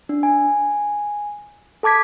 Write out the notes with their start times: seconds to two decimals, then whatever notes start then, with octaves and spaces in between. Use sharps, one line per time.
0.09 D4
0.23 G#5
1.83 A4 A5 D6 G#6 B6